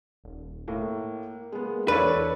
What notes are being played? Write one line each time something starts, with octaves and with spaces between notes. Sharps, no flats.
D#1
A2 A#3
G#3 B3
E2 D4 A4 B4 C#5